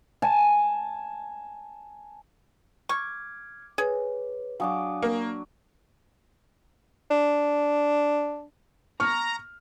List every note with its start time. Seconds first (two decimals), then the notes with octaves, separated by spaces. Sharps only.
0.22 G#5 A5
2.89 C#6 D6 F6 G#6
3.78 G#4 B4 C#5
4.60 F#3 D4 F5 G#5 D6 D#6
5.02 A#3
7.11 D4
9.00 A#5 C#6 F6